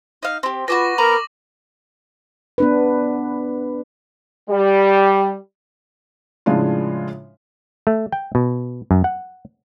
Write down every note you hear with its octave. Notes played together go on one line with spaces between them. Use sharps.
D#4 F5
C4 G4
F4 F#4 G#4 B4 C#6 D6 A#6
B3 A#4 A#5 F#7
B3 D4 B4
G3
A2 C#3 F3 G#3 D4 F4
A3
G5
B2
F#2
F#5